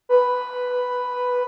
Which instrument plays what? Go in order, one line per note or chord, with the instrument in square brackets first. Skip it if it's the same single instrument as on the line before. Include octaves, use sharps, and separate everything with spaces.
[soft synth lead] B4